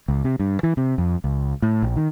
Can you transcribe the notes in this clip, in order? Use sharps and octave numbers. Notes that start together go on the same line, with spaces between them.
C#2
C3
G2
E3
C3
F2
C#2
A2
A#1
D#3